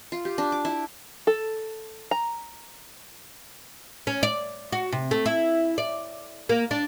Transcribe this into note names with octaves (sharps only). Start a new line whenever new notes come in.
F4
G4
D4
D6
E4
A4
A#5
C#4
D5
F#4
C3
A3
E4
D5
A#3
D4